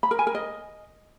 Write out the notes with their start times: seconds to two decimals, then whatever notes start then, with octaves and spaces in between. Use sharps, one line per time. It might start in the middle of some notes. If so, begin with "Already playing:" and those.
0.03 B5
0.11 A#4
0.19 G#5
0.27 A#4
0.35 D#5